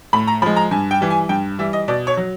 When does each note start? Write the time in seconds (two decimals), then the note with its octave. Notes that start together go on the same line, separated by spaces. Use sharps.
0.13 A2 B5
0.27 A#5
0.42 F3 B5
0.46 G#3
0.56 A#5
0.71 G2 G#5
0.91 G5
1.01 E3 G3
1.10 G#5
1.29 G2 G5
1.59 E3 G3 E5
1.73 D#5
1.88 B2 D5
2.07 C#5
2.17 F#3